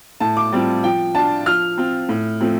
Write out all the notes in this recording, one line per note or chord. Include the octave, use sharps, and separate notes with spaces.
A2 A5
D6
G3 C4 F4
F3 G5
D4 F4 A5
F3 F6
C4 F4
A2
F3 A3 C4